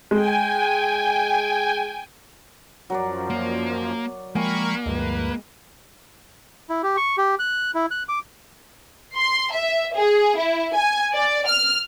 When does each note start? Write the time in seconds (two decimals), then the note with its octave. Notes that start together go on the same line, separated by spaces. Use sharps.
0.11 G#3 G5 G#5
2.90 F#2 F3 F#3 A#4 D5
3.30 A#3
4.35 F3 G#3 A#3 A#4 G5 G#5 B5 C#6
4.86 D2 G2 F3 G#3 B4
6.70 E4
6.83 G4
6.97 C#6
7.18 G4
7.39 F#6
7.75 E4
7.91 F#6
8.09 D6
9.15 C6
9.52 E5
9.94 G#4
10.36 E4
10.73 G#5
11.14 D5
11.48 F6